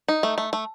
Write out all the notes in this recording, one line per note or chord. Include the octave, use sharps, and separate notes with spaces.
D#4
A3
A3
A3